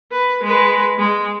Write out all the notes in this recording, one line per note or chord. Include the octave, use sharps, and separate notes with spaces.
B4
G#3 B4
G#3